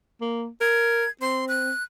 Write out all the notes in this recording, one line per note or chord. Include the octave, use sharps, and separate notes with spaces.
A#3
A#4 G#6
C4 C6
F#6